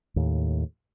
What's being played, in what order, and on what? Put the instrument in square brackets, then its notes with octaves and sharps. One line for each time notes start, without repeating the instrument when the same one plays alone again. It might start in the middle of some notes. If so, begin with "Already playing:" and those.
[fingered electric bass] D#2 A2